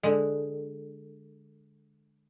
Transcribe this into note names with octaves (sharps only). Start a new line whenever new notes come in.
D3 G#3